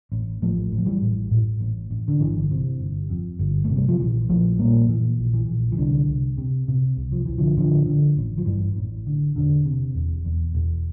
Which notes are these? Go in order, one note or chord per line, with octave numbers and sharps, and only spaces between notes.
A1
A1 F3 A3
A1
F3
E3 G3
A2
A2
A1
A1
D3
G1 E3
C3
G1
F2
G1
A3
C3
G3
F3
A#1 E3
A#1 F3 A3
A#2 G3 A#3
A#2 E3
A#1
E3
A#1
E3
C2 D3
C2
C3
C3
C2
F3
C2 E3
D3 F3
A1 D3 F3
D3
A1
F3
G2 E3
A1
D3
E1 D3
C3
E1
E2
E1